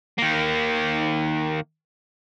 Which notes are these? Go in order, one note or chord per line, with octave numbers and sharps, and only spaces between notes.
D#3 A#3